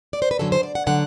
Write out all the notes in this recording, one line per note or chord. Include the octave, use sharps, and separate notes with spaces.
D5
C5
B4
F#2 D3 F#3 A4
C5
D5
F#5
D3 F#3 F#5